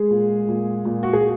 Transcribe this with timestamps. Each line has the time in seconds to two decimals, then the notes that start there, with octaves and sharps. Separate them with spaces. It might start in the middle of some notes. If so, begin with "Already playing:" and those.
Already playing: G#3 G#4
0.11 A#2
0.49 A#2
0.85 A#2
1.03 F#4
1.13 G#4